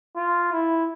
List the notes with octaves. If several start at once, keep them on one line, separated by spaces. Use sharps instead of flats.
F4
E4